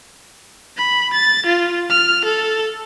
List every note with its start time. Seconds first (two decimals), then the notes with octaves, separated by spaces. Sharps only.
0.77 B5
1.14 A6
1.46 F4
1.90 F6
2.25 A4